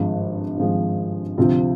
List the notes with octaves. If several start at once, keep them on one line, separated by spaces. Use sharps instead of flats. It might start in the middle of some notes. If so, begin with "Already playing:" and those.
Already playing: G#1 G2 F3 G#3
G#1 G2 F3 G#3
D2 C3 F3 C4 F4